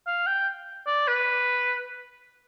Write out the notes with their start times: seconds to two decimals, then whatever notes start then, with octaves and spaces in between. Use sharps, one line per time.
0.07 F5
0.27 G5
0.87 D5
1.07 B4